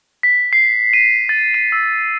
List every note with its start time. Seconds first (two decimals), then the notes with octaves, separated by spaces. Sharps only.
0.23 B6
0.53 C7
0.93 D#7
1.29 A6
1.54 D#7
1.72 E6